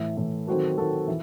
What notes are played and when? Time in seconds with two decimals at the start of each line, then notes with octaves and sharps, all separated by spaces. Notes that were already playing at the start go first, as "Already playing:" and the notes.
Already playing: A2 E3 A3
0.17 A2 E3 A3
0.47 D#3 F#3 C4 F#4 A4
0.78 D#3 F#3 C4 F#4 A4
1.08 E3